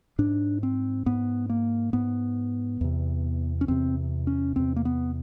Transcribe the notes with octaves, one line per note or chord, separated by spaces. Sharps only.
G#2 D4
C4
G#2 B3
A#3
G#2 B3
E2 C3
C#4
E2 C3 C4
C#4
E2 C3 C4
A#3
B3